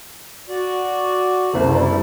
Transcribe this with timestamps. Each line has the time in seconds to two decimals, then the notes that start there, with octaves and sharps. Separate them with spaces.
0.49 F#4 D5
1.53 F#1 C2 G2 C5
1.75 G3 A3 E4 D5